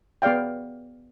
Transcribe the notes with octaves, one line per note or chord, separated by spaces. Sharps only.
B3 G#4 D5 F5 G5